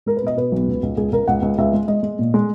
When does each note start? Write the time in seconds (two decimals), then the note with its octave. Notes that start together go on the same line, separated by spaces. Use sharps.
0.06 G#3 A#4
0.17 B4
0.23 B2 D#5
0.37 B2 B4
0.52 B1
0.68 C#2
0.83 C#2
0.97 C#2 G#4
1.12 C#2 A#4
1.28 C#2 F#5
1.42 C#2
1.58 C#2 E5
1.73 G#3
1.88 G#3 D#5
2.03 G#3
2.19 A#2
2.34 G#3